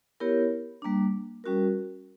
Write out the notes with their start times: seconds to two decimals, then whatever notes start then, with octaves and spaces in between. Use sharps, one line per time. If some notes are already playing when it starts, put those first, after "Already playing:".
0.20 B3 E4 G4 A#4 C#5
0.82 G3 A#3 D4
1.44 G3 C#4 F#4 A#4